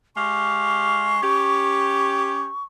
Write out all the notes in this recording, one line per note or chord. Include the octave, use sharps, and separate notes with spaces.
G#3 G4 F5 C#6
C#4 G4